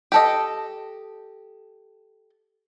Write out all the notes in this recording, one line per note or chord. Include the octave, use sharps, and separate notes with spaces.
G4 A4 D#5